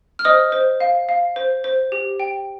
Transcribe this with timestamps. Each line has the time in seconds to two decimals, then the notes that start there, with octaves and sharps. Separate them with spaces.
0.19 F6
0.25 C5 D#5 D#6
0.52 C5
0.80 F5
1.09 F5
1.36 C5
1.64 C5
1.92 G4
2.20 G5